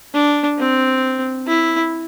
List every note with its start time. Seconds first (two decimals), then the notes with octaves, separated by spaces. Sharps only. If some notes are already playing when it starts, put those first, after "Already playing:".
0.14 D4
0.58 C4
1.47 E4